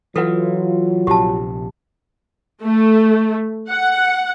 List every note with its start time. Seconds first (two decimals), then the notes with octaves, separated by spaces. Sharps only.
0.16 E3 F#3 F4 A4 B4 F#5
1.07 A#1 C3 G4 A5
2.62 A3
3.69 F#5